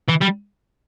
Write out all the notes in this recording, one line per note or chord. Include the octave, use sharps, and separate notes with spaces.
E3
G3